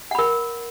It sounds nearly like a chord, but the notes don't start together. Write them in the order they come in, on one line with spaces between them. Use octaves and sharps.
F#5 B5 A#4